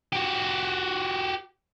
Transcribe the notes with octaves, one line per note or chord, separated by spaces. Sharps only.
F#4 G4